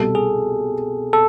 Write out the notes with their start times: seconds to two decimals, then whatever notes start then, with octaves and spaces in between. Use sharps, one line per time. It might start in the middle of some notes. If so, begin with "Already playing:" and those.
Already playing: C2 B2 G3 A4
0.15 G#4
1.13 A4